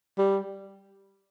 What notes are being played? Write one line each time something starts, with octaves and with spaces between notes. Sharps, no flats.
G3